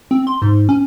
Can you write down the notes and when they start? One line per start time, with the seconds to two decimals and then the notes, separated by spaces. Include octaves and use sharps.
0.11 C4
0.27 C6
0.42 G#2
0.69 C#4